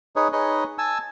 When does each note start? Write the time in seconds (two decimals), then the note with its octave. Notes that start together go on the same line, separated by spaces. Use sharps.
0.16 D#4 G#4 B4 C#5
0.33 D#4 G#4 B4 C#5 D#5
0.78 G#5 A5 E6